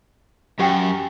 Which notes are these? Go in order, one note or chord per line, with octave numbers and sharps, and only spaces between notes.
F#2 G4 F#5 G5